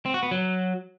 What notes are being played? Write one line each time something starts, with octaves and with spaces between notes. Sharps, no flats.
C4
F#4
B3
F#3